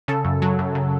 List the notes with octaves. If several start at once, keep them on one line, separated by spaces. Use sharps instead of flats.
C#3 A4
F#2
F#3
F#2
C#3